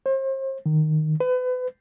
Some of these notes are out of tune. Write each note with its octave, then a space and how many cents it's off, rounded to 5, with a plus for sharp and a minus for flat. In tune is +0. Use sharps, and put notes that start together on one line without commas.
C5 +40
D#3 -10
B4 +35